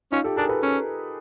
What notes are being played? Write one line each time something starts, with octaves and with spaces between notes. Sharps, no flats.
C#4 D#4 F4
G4 A4
D4 G#4 A#4
A4 B4
C#4